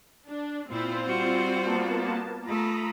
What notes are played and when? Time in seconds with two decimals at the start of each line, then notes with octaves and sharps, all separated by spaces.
0.28 D4
0.69 A#2 C4 E4 F4 C5
1.06 G3 F#4
1.66 A#3 B3 A5
2.45 A3 F4 A#5 B5 D#6